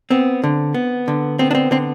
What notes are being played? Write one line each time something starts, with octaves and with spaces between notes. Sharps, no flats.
B3 C4
D3
B3
D3
B3 C4
D4
C4
D3 C4